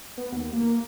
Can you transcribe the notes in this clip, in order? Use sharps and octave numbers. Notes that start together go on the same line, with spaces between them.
B3
D#2
A#3